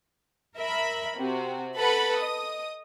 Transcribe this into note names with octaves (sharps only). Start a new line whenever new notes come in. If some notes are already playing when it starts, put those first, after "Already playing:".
A#4 E5 B5
C3 F#4
A4 B4 F#5 B5
D#5 D#6